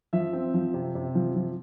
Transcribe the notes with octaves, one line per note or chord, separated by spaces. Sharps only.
F3 E5
C4
F3
C3
C3
F3
F3